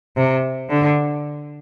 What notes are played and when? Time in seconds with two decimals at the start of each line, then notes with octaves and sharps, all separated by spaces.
0.17 C3
0.70 D3